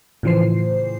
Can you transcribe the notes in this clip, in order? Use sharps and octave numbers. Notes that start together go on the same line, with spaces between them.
A2 C#3 E3 F3 C5 C7